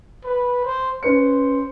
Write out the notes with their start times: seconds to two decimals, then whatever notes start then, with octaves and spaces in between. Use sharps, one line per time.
0.25 B4
0.65 C5
1.03 C#4 B4 C5 C#7